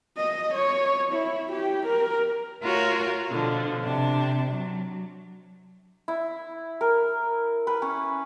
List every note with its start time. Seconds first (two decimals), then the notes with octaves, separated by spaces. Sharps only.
0.17 D#5
0.54 C#5
1.12 E4
1.52 G4
1.86 A#4
2.61 A3 F4 F#4 A#4 C#5
3.29 B2 D3 F3
3.82 C3 D4
4.50 F#3
6.08 E4
6.81 A#4
7.67 B4
7.82 C#4